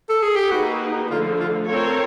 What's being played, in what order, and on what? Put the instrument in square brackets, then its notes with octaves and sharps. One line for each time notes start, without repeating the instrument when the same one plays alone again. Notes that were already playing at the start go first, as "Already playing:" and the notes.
[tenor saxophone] A4
G#4
G4
[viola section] A#3 D#4 G#4 B4 [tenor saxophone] F#4
[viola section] D3 F3 A3 [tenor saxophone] F4
[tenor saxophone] F4
[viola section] C4 F4 A#4 C#5 [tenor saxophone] A4